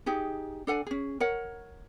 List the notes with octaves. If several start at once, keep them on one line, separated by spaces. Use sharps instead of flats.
D#4 G4 G#4
D4 A4 F#5 G#5
C#4 G#4
A#4 C#5 F#5